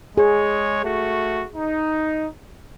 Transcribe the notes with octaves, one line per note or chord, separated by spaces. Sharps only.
G#3 G#4 C#5
A3 F#4
D#4